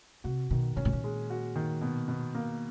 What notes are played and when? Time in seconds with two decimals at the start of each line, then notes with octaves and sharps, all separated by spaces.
0.24 C3 F#4
0.51 B2 D#3
0.76 A#2 C#4
0.85 A2
0.93 A#2
1.04 G#3
1.30 F#4
1.56 D#3
1.81 B2
2.08 B2
2.35 A#3